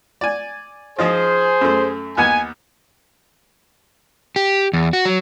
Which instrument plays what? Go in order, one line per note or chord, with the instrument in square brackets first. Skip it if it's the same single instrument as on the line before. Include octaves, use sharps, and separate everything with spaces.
[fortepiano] D5 G#5
[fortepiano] F3 D#4 F4 [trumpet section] G#4 C5
[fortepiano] F#2 A3
[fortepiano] D#2 B3 [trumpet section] G#5
[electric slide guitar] G4
E2
F#4
F#3